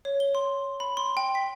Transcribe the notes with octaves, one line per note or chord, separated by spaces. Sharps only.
C#5
G7
C6
B5
C6
G5
B6